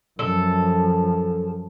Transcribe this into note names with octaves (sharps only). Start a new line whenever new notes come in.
F#2 F3 A4